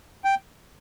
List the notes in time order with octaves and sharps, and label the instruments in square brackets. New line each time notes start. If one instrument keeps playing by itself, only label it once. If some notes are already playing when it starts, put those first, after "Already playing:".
[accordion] G5